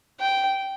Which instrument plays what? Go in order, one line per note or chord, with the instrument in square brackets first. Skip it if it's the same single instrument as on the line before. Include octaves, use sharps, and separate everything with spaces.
[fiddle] G5